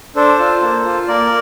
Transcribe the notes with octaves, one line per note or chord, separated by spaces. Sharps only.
D4 A4 C5
F4
A#3
F4
A#3 A#4 D5